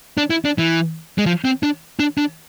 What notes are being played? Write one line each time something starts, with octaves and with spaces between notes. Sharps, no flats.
D4
E4
D4
E3
G#3
F3
C4
D4
D4
D4